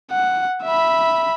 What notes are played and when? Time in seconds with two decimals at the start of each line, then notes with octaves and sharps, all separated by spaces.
0.12 F#5
0.64 E5 B5